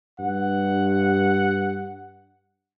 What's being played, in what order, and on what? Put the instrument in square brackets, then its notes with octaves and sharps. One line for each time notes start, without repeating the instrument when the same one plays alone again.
[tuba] G2 [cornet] F#5